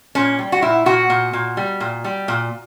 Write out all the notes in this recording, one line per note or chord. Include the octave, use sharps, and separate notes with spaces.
A#2 C#4
G3
F#4
A#2 E4
A#2 F#4
A#2
A#2
G3
A#2
G3
A#2